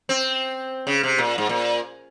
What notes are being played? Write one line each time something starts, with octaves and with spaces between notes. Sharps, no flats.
C4
C#3
C3
A#2
G#2
A#2